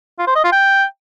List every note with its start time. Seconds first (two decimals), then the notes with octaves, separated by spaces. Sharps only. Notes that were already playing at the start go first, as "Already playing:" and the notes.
0.19 F4
0.27 C5
0.36 D#5
0.44 F4
0.52 G5